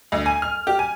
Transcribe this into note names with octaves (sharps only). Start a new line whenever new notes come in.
D2
G#5
F6
G4
G#5